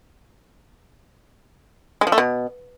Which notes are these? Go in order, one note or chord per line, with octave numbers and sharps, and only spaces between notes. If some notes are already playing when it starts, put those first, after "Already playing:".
G#3
F3
A3
B2